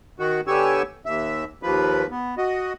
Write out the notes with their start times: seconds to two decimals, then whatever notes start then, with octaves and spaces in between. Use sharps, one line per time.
0.19 D#3 F#4
0.47 D3 B3 G4 C#5 G#5 E6
1.06 D#2 E5
1.63 D#2 F3 B4
2.11 B3
2.38 F#4 D#5